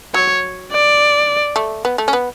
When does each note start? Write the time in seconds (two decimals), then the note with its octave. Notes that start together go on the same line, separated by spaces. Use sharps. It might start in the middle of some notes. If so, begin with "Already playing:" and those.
0.14 F#3 C#5
0.72 D5
1.56 A3
1.85 B3
1.98 A3
2.08 C#4
2.13 B3